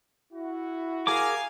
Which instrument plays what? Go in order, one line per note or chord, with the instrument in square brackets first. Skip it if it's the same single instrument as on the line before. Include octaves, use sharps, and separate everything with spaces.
[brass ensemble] E4 F#4
[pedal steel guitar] G#4 A#4 D6 [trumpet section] F5 G#5